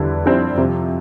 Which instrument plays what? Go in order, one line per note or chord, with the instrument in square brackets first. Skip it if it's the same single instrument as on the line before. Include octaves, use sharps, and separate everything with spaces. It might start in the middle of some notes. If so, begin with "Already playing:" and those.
Already playing: [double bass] E2 [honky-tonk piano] D3 G3 E4
[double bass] F2 [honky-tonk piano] G3 C4 E4
[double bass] F2 [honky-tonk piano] C3